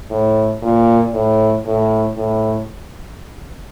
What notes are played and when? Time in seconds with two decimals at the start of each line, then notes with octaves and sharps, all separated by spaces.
0.10 A2
0.62 A#2
1.14 A2
1.65 A2
2.17 A2